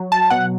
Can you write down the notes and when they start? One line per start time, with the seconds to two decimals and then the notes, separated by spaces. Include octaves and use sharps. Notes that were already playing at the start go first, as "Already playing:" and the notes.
Already playing: F#3
0.12 A5
0.30 B2 F#5